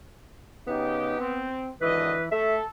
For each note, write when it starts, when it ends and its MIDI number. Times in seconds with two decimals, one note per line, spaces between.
0.67 1.15 49
0.67 1.48 59
0.67 1.15 63
0.67 1.15 67
1.18 1.69 60
1.82 2.14 32
1.82 2.14 50
1.82 2.29 52
1.82 2.24 71
1.82 2.14 75
2.32 2.57 57
2.32 2.64 69
2.32 2.58 76